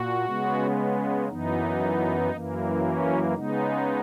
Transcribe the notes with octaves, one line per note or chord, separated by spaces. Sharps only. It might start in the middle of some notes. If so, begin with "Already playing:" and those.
Already playing: A#2 F#4
C#3 G#3 B3
F#2 E3 B3 D#4
F#2 E3 A#3
C#4
C#3 G#3 B3 D#4